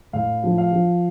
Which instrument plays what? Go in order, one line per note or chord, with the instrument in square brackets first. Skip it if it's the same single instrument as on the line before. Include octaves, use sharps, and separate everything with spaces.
[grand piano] A2 F5
F3
F5
F3